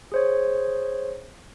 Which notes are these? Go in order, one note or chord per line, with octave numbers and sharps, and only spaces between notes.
G#4 C5 C#5